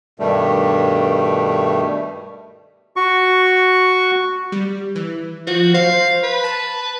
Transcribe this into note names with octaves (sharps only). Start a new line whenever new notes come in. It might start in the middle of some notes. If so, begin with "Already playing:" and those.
G2 B2 D#3 G3 A3
F#4 C#6
G3
E3
F3 F#4
C5 F5
B4
A5